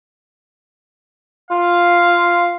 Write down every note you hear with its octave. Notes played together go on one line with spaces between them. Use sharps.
F4 F5